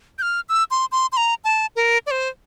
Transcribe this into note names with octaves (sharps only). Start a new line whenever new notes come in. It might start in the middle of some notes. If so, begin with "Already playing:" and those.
G6
F6
E6
C6
C6
C6
A#5
A5
A#4
D5
C5